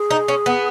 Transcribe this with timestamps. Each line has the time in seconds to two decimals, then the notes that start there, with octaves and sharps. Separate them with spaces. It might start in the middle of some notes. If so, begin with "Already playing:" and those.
Already playing: G#4
0.11 D#4
0.28 C#4
0.46 B3